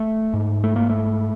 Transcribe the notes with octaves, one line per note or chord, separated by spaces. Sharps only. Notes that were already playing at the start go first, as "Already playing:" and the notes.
Already playing: A3
G#2
A3
A#3
A3